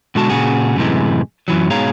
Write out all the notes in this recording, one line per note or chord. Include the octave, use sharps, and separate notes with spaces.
B2 D3 G#3 F#4 A5
A#2 C#3 F#4 G#4
F#2 A2 C3 E3 G#3
F#2 E3 F#3
G#2 B2 G#4 C#5 F5 A#5